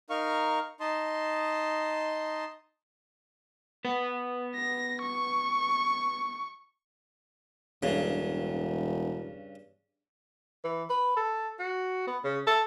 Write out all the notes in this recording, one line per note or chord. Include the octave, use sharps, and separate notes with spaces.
D#4 A#4 F5 C#6
D#4 D#5 A5 C6
B3 B4
A#6
C#6
E1 G2 C#3
E3
B4
A4
F#4
B3
C#3
A4